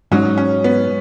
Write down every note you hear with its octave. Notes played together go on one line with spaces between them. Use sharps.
G#2 F#3 C#4 D#4
C#4
B3